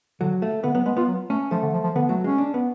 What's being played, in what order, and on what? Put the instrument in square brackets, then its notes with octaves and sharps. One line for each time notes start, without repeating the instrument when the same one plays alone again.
[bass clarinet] D3 [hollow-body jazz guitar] F#3
[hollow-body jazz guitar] A3
[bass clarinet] D3 [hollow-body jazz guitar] B3
[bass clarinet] F#3 [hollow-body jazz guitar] B3
[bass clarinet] G#3 [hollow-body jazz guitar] B3
[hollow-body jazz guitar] B3 [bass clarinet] F4
[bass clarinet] F#3
[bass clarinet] A3 [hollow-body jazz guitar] C#4
[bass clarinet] F3 [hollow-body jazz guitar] A3
[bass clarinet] D3
F3
F3
[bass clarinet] D3 [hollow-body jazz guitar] B3
[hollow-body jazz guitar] F#3 [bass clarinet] A3
[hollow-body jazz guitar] G#3 [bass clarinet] C#4
[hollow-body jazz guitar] D4
B3